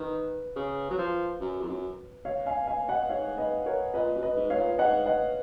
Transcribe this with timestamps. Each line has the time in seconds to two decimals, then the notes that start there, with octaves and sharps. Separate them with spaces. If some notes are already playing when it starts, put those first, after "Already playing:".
Already playing: D#3 B4
0.56 C#3
0.90 F#3
0.98 F3
1.40 F#2
1.61 F2
1.68 F#2
2.25 C#5 F5
2.46 F5 G#5
2.67 F5 G#5
2.88 D#5 F#5
3.09 G#2 C#5 F5
3.38 B4 D#5
3.66 A#4 C#5
3.94 A#2 B4 D#5
4.15 F#2
4.22 B4 D#5
4.36 G#2
4.50 C#5 F5
4.57 A#2
4.78 G#2 D#5 F#5
5.06 D#5 F#5